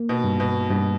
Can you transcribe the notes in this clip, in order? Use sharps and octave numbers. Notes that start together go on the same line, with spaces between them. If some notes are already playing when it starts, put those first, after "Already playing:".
Already playing: A#3
B2
G2
B2
G2 B2